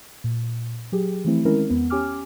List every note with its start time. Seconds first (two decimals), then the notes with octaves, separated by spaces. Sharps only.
0.24 A#2
0.92 F#3 G4 G#4
1.25 E3 F3 A3 C4 E4
1.45 D#3 G#3 C4 C#4 E4 A#4
1.70 E2 B3
1.90 C#4 G4 G#5 D6 F6